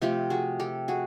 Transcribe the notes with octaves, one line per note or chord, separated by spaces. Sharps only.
C3 F3 A3 C4 F4 G4
F#4 G#4
G4 A4
F#4 G#4